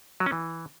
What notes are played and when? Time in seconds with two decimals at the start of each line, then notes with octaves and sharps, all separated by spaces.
0.20 F#3
0.26 C#4
0.32 E3